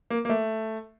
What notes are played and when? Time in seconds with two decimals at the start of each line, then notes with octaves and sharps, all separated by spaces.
0.10 A#3
0.25 A#3
0.30 A3